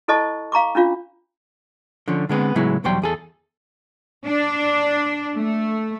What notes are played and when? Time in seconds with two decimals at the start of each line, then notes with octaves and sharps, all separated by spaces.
0.08 E4 A4 C5 D#5 A5 C#6
0.52 F5 A#5 C#6 D6
0.75 C#4 D4 F4 F5
2.08 D3 F3 C#4
2.29 D3 G#3 B3 C4
2.56 A2 C#3 F#3 G#3 B3 E4
2.84 B1 E2 F#3 G3 C5 G5
3.02 E2 G#4 A4
4.25 D4
5.35 A3